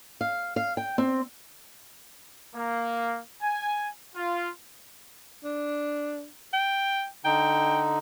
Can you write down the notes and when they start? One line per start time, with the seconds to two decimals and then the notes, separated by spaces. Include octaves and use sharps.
0.21 F5
0.56 F5
0.77 G5
0.98 C4
2.54 A#3
3.41 G#5
4.15 F4
5.44 D4
6.53 G5
7.25 D3 D#4 G5